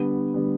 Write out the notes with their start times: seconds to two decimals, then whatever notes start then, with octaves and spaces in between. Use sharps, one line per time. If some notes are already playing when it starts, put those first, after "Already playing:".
Already playing: D3 G3 B3
0.34 D3 G3 B3